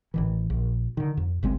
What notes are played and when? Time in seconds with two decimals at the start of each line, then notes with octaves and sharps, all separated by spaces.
0.14 A1 D#3 E3
0.50 A#1
0.97 D3 D#3
1.17 F2
1.43 G1 C#2 G#3 C4